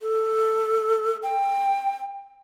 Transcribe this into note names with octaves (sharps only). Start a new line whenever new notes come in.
A4
G5